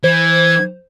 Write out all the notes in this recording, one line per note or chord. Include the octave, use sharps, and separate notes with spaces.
E3 C5 G#6